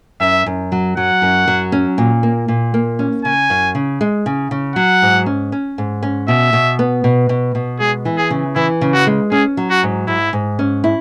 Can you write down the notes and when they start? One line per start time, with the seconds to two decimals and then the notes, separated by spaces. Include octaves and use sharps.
0.20 F#2 E5
0.46 F#2
0.72 F#3
0.97 F#3 F#5
1.22 F#2
1.47 F#3
1.72 C#4
1.98 A#2
2.23 A#3
2.48 A#2
2.74 A#3
2.99 C#4
3.25 C#3 G#5
3.50 F#2
3.75 C#3
4.01 G#3
4.26 C#3
4.51 C#3
4.76 F#3 F#5
5.02 G#2
5.26 C#4
5.52 C#4
5.78 G#2
6.03 C#4
6.28 B2 E5
6.53 B2
6.79 B3
7.04 B2
7.29 B2
7.55 B2
7.80 G#3 G#4
8.05 E3
8.17 G#4
8.30 C#3
8.55 E3 E4
8.81 C#3
8.94 F#4
9.07 G#3
9.31 C#4 G#4
9.57 F#3
9.70 F#4
9.83 G#2
10.07 G#2 E4
10.33 G#2
10.59 C#4
10.84 E4